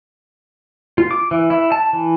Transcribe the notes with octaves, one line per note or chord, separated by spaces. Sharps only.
F4
D6
E3
E4
A5
E3